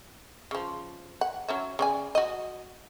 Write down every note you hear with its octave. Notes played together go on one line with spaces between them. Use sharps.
C#3 F3
F#5
F#3 C#4 E5
C#3 D5 G#5
F#4 D#5